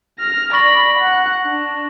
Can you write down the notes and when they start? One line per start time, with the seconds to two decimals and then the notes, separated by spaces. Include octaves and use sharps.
0.19 F6 A#6
0.53 D5 B5 C#6 A#6 F#7
0.99 F#5
1.45 D4